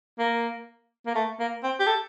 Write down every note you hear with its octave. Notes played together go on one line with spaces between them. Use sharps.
A#3
A#3
A3
A#3
C4
G4
A4